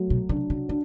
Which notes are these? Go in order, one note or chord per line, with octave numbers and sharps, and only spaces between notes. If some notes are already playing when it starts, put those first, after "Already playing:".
Already playing: F#3 A3
B2
C#3 D4
C#3
D3 D4